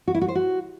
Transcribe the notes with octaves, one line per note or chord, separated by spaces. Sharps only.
F#4
E4
F#4
C5
F#4